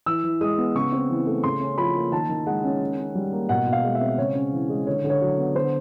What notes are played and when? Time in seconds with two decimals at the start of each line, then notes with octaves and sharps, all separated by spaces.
0.06 E3 E6
0.24 E3
0.41 G#3 D#6
0.58 B3
0.75 C#3 C#6
0.92 C4
1.10 E3
1.27 A3
1.44 C#3 C6
1.61 C#4
1.78 F3 B5
1.95 A#3
2.12 D#3 A5
2.29 D#3
2.47 G#3 F#5
2.64 C#4
2.81 D#3
2.98 C#4
3.15 G3
3.32 A#3
3.49 B2 F#5
3.67 B2
3.73 F5
3.84 G#3
3.95 E5
4.01 C4
4.18 C#3 C#5
4.35 C#4
4.52 E3
4.69 G#3
4.87 D3 C#5
5.04 D3
5.10 C#5
5.21 F#3
5.39 B3
5.55 D3 C5